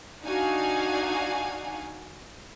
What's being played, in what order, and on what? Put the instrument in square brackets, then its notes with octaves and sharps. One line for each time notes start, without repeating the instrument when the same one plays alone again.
[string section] D4 D#4 F#4 F5 F#5 G#5